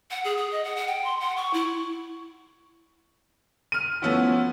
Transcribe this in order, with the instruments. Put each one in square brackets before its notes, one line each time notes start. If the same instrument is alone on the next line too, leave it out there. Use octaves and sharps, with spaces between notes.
[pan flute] F#5
G#4
G#4
D#5
F#5
F#5
G5
C6
F#5
C#6
E4
[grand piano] F6 D#7
F3 A3 B3 C#4 E4 F#4